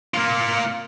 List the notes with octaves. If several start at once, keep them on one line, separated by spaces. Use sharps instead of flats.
A#3 F4